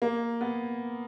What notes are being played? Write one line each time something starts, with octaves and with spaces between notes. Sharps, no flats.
A#3
B3